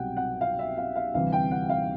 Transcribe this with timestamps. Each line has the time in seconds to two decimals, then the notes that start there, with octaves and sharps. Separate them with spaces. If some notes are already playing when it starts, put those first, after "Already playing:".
Already playing: C2 B2 F#3 F#5 G5
0.17 F#5
0.41 F5
0.59 E5
0.78 F5
0.96 F5
1.14 D2 C3 E3 G3 F5
1.32 G5
1.51 F#5
1.69 F5